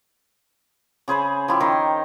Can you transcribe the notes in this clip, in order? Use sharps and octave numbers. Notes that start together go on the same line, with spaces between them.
C#3 G#4 C5 B5
F3 E4 G4
D#3 A#4 C6